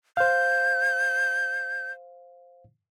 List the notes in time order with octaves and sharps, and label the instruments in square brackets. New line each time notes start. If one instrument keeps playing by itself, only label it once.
[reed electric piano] C5 F5 [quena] G6